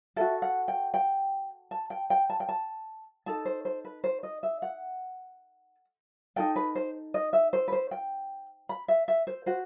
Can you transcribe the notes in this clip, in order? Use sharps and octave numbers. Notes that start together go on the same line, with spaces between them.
F#4 A4 E5
F#5
G5
G5
A5
G5
G5
A5
G5
A5
D#4 A4 A5
C5
C5
B4
C5
D#5
E5
F#5
D#4 F#4 A4 G5
B4
C5
D#5
E5
C5
B4
C5
G5
B5
E5
E5
C5
F#4 C5